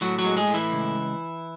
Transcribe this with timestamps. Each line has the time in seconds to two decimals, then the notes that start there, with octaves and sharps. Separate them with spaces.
0.01 A2 F#3 F#4
0.19 F#3 F#4
0.25 G#3
0.37 G#3 G#4
0.48 A2
0.54 E3 E4
0.72 C#2